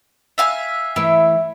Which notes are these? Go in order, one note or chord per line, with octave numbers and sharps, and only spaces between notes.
E5 F5 G#5
E3 A3 E4 E5